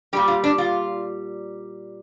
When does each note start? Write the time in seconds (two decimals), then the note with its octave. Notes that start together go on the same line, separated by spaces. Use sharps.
0.13 G3 G4
0.17 A#2
0.28 F4
0.44 D4
0.58 F4